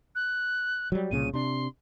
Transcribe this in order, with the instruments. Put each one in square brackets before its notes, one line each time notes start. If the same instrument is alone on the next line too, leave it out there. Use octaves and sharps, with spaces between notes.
[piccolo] F#6
[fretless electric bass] F#3 G3
[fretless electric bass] C2 A#2 C#3 [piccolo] D#7
[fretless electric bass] C3 D4 [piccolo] C6